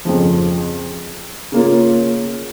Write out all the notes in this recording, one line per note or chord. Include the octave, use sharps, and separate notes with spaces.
F2 C#3 F3
C#3 A#3 C#4 F4